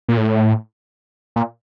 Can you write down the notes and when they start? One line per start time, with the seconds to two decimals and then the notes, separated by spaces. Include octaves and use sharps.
0.09 A#2
0.17 A2
1.36 A#2